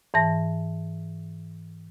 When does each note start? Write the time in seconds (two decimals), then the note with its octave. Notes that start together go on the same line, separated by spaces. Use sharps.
0.14 G#2 E3 A5 A#6